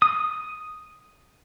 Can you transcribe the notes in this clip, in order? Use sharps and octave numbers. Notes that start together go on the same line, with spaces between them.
D#6